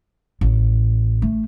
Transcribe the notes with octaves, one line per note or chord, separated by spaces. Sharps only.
A1
A3